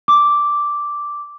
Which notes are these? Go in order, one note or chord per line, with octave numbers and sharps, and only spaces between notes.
D6